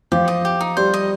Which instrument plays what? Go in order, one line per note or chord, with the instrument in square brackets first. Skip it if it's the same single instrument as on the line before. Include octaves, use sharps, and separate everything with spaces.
[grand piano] F3 [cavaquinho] G4
[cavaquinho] D#5
G4
D#4
[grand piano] G3 [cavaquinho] C5
[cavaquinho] D#5